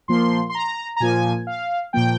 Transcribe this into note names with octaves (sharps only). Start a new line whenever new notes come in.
A#2 F3 A#3 C6
C6
A#5
A#5
A#2 F3 A#3 G#5
F5
A#2 F3 A#3 G5